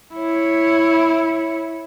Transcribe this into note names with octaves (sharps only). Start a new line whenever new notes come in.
E4 C#5